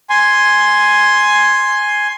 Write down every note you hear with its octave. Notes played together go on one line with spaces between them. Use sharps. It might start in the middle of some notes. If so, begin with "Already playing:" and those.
G#5 C6